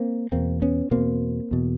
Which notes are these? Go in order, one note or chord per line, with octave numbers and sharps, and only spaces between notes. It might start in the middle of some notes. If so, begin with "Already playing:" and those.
Already playing: A#3 C4
E2 B2 A#3 C4
B3 C#4
E2 B2 A#3 C4
E2 B2